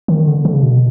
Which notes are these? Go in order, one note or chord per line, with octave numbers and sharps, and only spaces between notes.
D#3
D3
D3
C#3
B2